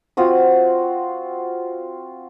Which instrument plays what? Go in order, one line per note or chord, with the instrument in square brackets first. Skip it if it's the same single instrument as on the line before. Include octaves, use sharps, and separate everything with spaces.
[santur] C4 F4 F#4 D#6